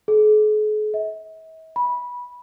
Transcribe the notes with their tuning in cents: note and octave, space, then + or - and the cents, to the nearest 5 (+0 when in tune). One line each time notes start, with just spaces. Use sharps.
G#4 +45
E5 -45
B5 -15